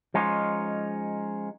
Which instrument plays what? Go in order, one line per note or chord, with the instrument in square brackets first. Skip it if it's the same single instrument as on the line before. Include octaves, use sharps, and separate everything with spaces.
[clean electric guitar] F3 G#3 C#4 D#4 F4